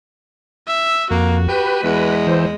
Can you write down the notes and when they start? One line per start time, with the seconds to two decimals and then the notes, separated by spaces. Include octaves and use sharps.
0.67 E5
1.11 F2 A#3 F#4
1.49 G4 B4
1.84 E2 G#3
2.27 E3 C5